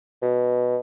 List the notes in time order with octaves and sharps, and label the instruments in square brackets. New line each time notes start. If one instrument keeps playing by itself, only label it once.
[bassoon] B2